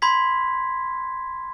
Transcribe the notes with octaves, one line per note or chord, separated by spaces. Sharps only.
B5 C6 G#6 B6